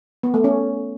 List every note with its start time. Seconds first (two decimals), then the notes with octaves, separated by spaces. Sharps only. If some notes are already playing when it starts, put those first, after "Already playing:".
0.23 B3
0.34 A3
0.44 C#4